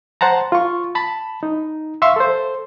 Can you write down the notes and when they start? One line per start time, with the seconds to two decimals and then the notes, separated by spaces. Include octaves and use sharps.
0.21 C5 F#5 A5 A#5
0.52 F4 C#6
0.95 A5 B5
1.43 D#4
2.02 E5 F5 C6 C#6 E6
2.16 A4 C5